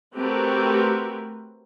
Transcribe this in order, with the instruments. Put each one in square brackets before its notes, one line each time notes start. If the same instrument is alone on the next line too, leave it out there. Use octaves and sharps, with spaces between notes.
[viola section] A3 C4 F#4 G4 A#4 B4